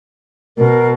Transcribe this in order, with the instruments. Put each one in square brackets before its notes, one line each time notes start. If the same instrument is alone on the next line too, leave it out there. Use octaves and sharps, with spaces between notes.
[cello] B2 [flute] A#4